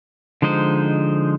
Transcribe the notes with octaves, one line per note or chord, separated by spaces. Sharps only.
D3 F3 G#3 D#4 C5